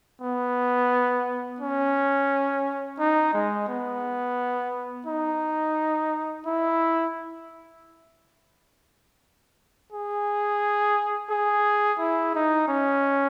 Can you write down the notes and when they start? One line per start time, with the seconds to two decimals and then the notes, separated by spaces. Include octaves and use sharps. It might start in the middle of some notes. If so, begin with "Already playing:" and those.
0.22 B3
1.60 C#4
2.99 D#4
3.34 G#3
3.68 B3
5.07 D#4
6.46 E4
9.92 G#4
11.30 G#4
11.99 E4
12.35 D#4
12.69 C#4